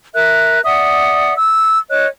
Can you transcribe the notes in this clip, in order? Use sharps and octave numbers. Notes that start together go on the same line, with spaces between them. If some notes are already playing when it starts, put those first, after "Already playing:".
A#4 E5 F#6
D5 E5 F#5 D#6
E6
C#5 D#5 F#6